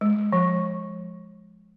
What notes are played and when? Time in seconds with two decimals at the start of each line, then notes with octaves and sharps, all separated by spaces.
0.01 G#3
0.33 F3